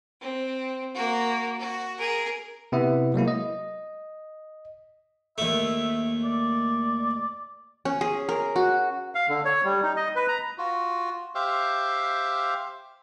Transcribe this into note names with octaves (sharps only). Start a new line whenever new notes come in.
C4
A#3 F#4
F#4
G#4 A#4
C3 B3 E4 E5
F#3 G#3 A#3 E4
D#5
D#2 A3 E5
D5
C#4
G#4
A#4
F#4
F5
D3
C#5
G3
D#4
D#5
B4
A#5
F4 F#4
G4 C5 E5 F5